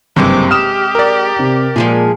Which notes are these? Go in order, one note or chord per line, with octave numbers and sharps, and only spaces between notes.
F#1 G2 C3 G3 G#3 C4 C5 D6
G4 D#6 F6 E7
A#4 D5
C3
A#2 F3 G#3 G#4